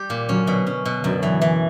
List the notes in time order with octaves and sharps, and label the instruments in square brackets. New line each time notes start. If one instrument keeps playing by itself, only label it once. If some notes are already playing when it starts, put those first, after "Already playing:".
Already playing: [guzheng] G3 G4
A#2
[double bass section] D3 F#3 [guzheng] C#4
[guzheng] B2
C#4
B2
[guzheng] F#2 [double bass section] D3 F#3
[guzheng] E3
E3